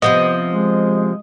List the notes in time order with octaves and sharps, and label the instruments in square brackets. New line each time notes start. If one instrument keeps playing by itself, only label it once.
[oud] C3 F3 B3 [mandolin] D#5
[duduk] G#3